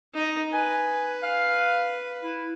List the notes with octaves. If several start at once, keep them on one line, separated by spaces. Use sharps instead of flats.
D#4 D#5
B4 G#5
F5
E4